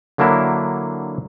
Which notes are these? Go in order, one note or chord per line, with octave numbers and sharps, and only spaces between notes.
D3 F#3 A#3 D4 E4